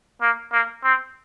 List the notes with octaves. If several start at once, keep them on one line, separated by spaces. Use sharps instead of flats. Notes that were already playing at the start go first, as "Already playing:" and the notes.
A#3
A#3
C4